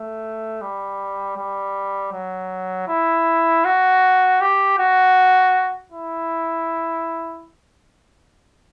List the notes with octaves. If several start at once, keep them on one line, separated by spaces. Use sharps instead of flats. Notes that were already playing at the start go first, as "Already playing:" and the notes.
Already playing: A3
G3
G3
F#3
E4
F#4
G4
F#4
E4